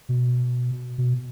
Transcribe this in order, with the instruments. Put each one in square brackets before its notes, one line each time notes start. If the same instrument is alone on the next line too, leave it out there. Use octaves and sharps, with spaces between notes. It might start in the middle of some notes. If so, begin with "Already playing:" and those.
[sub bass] B2
B2